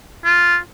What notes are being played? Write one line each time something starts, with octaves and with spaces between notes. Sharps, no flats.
F4